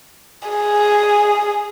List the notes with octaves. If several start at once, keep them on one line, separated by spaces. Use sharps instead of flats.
G#4